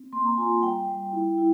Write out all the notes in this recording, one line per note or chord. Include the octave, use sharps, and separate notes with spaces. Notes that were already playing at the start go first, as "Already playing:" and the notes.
Already playing: C4
A#3 C6
A#5
F4 G#5
G3 G5
G3
E4
E4